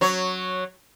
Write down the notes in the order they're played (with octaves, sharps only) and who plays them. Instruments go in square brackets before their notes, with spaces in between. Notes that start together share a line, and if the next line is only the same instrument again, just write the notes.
[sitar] F#3 C#5